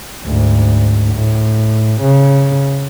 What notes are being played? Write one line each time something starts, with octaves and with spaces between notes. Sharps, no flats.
D2 G#2
A2
C#3